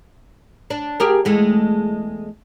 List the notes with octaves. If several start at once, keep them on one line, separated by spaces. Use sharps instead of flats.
D4
G4 G#4 A#4
E2 G#3 A3